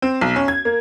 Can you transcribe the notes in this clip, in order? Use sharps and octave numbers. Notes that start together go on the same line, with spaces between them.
C4
B1
C#4
G#6
A#3